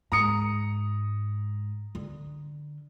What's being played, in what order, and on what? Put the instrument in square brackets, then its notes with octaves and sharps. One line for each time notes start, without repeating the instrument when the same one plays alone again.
[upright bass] G#2 [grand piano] A#5 D#6 C#7
[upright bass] D3